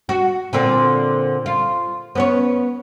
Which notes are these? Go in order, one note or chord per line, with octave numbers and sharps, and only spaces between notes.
F#4
A#2 D3 C4
F4
B3 C#4 C#5